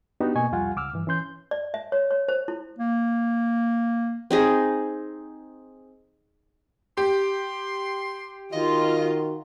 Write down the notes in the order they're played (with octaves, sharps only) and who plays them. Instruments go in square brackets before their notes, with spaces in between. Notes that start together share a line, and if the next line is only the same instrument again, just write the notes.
[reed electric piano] B3 D4 D#4 F#4 G4
B2 A#3 D#5 G#5 C#6
C2 F2 G3 F4 F#5 G#5
C#2 D6 E6 F6
G2 E3
E3 C#4 C6 G6
[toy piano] D5
E5
C#5
C#5
C5
E4
[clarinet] A#3
[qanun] C4 D#4 G#4
[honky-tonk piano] G4 [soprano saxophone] C6
[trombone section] D#3 F#4 [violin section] F4 [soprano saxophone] D#5